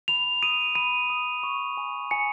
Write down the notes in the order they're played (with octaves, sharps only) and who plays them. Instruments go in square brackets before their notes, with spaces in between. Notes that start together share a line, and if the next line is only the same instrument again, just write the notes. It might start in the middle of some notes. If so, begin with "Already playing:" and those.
[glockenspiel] B5 F7
D#6 D#7
B5 D#7
D#6
C#6
G#5
G#5 C#7